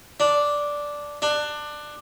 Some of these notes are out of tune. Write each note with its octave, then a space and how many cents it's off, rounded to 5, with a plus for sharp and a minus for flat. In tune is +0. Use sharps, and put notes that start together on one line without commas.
D4 -5
D4 +20